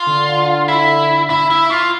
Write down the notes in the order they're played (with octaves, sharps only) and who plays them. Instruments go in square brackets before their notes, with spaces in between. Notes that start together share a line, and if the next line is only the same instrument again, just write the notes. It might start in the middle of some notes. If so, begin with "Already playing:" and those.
Already playing: [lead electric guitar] F4
[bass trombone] D3
[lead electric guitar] E4
E4
E4
F4